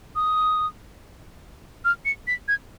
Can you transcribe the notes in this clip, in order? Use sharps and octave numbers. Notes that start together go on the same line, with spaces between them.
D#6
F6
C#7
B6
G#6